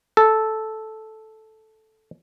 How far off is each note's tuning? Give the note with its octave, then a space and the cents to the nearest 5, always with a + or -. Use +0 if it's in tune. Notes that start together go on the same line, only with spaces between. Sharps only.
A4 -5